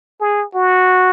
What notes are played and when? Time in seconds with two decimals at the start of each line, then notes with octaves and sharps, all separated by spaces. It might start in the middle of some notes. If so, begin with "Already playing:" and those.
0.21 G#4
0.55 F#4